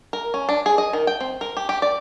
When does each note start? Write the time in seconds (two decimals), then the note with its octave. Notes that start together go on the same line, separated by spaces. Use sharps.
0.13 A#4
0.34 C#4
0.49 D4
0.66 G#4
0.78 D#5
0.93 D#3
1.07 G5
1.21 C4
1.41 A#4
1.57 G4
1.69 G4
1.82 D5